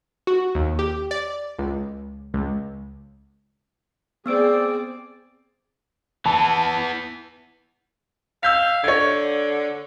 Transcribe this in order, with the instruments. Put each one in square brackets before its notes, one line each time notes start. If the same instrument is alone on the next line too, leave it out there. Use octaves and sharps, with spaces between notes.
[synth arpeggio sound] F#4
D#2
G4
D5
C#2
C#2
[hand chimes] B3 E6 D7 [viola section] C4 G#4 D5
[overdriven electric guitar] E3 B3 [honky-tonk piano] A5
[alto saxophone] F5 [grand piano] E6 G6 B6
[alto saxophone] D3 [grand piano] C#5 G#6